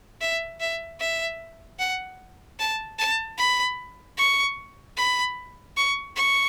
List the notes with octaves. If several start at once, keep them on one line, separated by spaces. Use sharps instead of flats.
E5
E5
E5
F#5
A5
A5
B5
C#6
B5
C#6
C#6